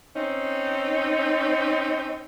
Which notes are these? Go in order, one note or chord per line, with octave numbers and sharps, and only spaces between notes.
C4 C#4 D#4